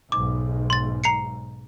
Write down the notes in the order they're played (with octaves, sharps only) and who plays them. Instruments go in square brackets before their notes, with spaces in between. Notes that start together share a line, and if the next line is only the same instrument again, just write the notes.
[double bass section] B1 G#2 [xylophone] D6
[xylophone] C6 A6
A#5 C7 C#7